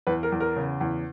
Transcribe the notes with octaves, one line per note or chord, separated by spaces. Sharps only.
E2 B4
A#4
E2
A#4
C#3
E2